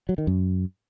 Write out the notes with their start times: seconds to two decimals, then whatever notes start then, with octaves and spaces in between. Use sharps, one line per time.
0.09 F#3
0.18 D#3
0.27 F#2